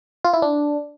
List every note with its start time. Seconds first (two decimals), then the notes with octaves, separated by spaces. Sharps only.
0.25 F4
0.33 E4
0.42 D4